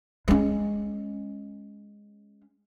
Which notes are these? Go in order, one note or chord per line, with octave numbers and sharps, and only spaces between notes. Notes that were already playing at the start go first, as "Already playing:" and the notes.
G#3 C#4